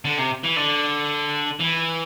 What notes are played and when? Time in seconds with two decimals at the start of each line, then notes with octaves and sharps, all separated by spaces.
0.05 D3
0.18 C3
0.44 E3
0.57 D3
1.59 E3